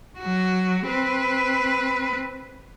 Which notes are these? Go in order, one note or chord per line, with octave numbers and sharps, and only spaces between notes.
F#3 F#4
C4 B4